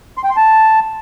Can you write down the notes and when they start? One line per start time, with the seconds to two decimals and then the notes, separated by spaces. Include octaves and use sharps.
0.18 C6
0.24 G5
0.30 C6
0.37 A5